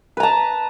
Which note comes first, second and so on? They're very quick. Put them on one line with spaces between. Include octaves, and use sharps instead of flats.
B4 A#5 A5